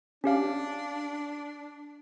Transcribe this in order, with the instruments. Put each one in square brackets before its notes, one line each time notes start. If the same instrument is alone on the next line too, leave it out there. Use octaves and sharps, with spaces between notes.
[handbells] C#4 G4 F5 [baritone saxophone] D4